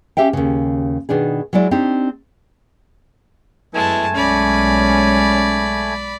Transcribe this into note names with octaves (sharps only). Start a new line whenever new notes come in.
C#4 G4 E5 F5 G5
D#2 C#3
B2 D#3 D4 G#4
F#3 G#3 E4 D5
C4 D4 D#4 G4
F#2 G#3 A3 B3 E4 G#5 A5
B1 G#3 C#4 D5 B5